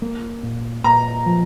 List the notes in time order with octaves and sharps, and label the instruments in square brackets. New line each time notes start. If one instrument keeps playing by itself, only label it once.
[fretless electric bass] A#3
A#2
[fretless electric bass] A#2 [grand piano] A#5
[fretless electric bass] F3